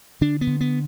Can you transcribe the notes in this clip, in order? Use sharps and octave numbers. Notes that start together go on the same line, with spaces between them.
D3 D4
B3
D3
B3